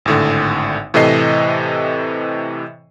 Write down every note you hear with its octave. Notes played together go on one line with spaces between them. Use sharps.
G#1 A2 D3
A2 C3 E3 A4 D#5 C7